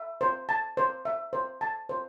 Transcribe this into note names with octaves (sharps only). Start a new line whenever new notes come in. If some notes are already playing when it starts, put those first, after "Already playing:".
Already playing: E5
C5
A5
C5
E5
C5
A5
C5